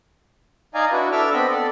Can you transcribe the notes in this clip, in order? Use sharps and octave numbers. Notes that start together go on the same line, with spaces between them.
D#4 D5 D#5 F5 G#5 A#5
D4 E4 F#4 B4
D4 A4 E5 D6 E6 F6
B3 C4 D#5 B5
A4 D5